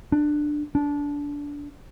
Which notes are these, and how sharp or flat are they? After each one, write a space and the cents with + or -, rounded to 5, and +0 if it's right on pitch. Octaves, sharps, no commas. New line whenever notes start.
D4 +15
D4 -20